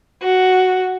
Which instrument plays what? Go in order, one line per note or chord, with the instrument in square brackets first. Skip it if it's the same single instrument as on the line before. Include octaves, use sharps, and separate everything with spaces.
[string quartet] F#4